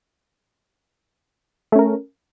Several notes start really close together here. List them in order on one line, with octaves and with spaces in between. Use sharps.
A3 C#4 A#4